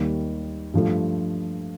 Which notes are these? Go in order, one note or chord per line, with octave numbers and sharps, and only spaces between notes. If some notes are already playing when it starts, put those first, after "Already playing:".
Already playing: D#2 D#3 G3 A#3
G2 F3 A3